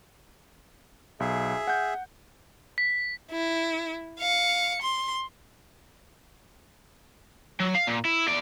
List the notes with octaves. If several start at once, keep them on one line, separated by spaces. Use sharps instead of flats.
B1 G#4 E5
F#5 G6
B6
E4
F5 C#7
C6
F#3
F5
A#2
E4
E2 D5